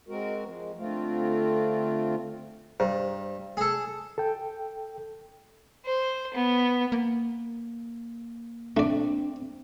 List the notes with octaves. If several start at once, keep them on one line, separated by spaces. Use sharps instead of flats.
G#3 C4 F#4 A#4
F3 G#3
D3 A3 C4 F4
G2 C5
G#4 A4
A4 G5
C5
B3
A#3
A3 C4 D4 D5